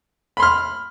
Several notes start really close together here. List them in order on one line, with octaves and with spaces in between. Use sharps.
B5 C6 F6